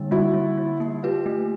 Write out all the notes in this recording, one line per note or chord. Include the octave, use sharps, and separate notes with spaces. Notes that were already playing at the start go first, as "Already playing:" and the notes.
Already playing: D3 G3 A#3 D#4
G3 E4 F#4
G3
G3
A#3
F4 G4 B4
A3